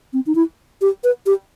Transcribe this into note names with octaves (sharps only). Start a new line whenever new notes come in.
C4
D#4
E4
G4
B4
G4